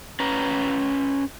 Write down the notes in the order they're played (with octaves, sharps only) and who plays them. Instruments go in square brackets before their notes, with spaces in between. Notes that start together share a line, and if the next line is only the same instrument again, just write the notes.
[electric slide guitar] C#4 B4 A#5